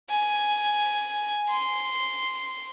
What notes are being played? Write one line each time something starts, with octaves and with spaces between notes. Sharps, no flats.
G#5
C6